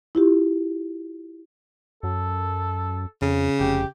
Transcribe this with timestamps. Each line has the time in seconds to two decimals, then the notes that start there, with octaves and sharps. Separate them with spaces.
0.15 E4 F4 G4
2.03 F#2 A4
3.22 F2 C#3
3.60 F1 G4